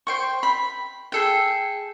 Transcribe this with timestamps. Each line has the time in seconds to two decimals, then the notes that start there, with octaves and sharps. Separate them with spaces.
0.07 C5 G5 C#6
0.43 B5
1.12 G#4 A4 G5